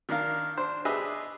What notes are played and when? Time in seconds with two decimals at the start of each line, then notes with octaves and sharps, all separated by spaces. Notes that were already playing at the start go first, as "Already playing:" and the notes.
0.09 D#3 D4 A#4 F5
0.57 D4 C5 C6
0.85 D4 G4 G#4 B4 D#5 E5